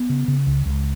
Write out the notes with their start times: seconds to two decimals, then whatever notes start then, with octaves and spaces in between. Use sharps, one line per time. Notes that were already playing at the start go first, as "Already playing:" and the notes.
Already playing: B3
0.09 C#3
0.28 C#3
0.47 C#2
0.66 C#2